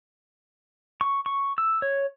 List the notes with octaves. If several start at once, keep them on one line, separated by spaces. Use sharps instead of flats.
C#6
C#6
E6
C#5